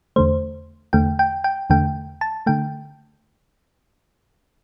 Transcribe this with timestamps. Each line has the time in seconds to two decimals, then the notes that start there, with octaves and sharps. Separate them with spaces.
0.16 E2 D3 A3 C5
0.93 E2 D3 A3 G5
1.19 G5
1.44 G5
1.70 E2 D3 A3 G5
2.21 A5
2.46 D3 A3 G5